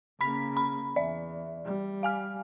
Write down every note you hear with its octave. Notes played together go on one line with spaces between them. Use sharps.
C#3 A#3 B5 B6
B5
E2 D5 E5
G3
F5 G#5 F6